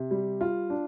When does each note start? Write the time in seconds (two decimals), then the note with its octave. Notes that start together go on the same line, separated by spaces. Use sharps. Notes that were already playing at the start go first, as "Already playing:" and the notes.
Already playing: C3
0.11 G3
0.41 F4
0.70 D4